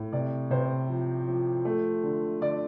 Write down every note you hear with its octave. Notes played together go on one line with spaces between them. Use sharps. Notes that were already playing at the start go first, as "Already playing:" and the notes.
Already playing: A2
C3 D5
C3 C5
F3
F3
A3
D3
D3 D5